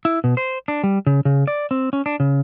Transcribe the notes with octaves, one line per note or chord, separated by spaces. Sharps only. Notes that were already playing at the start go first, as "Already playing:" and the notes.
E4
B2
C5
D4
G3
C#3
C#3
D5
C4
C#4
D4
C#3